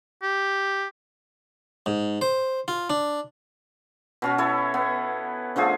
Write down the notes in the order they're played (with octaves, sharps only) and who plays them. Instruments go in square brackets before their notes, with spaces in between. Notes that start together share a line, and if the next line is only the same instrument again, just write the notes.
[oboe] G4
[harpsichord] G#2
C5
F4
D4
[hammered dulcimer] B2 C#4 F#4
E4 A4 C#5
B3
D3 F3 A3 G#4